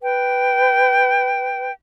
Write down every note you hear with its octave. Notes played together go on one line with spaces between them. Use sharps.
B4 G5